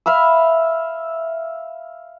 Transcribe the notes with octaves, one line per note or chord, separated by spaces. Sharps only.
E5 F5 B5 E6